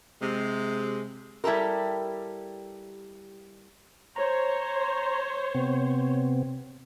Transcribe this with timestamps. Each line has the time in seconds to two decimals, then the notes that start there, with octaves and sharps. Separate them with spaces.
0.22 C3 G#3
1.44 G3 E4 G4 A4 A#4
4.16 C5 C#5 A#5
5.55 C3 B3 C4